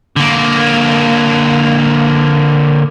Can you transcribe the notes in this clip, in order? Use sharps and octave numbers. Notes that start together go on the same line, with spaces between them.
D3 A#3